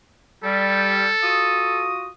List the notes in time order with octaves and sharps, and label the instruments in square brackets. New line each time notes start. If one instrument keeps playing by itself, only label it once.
[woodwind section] G3 [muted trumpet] A4
[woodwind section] F4 F#4 D#6